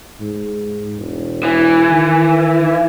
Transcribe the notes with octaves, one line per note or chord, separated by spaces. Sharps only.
G#2
E1
E3
D#3